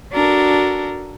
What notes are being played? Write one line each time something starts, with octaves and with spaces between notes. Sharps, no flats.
D4 F#4 A4 A#4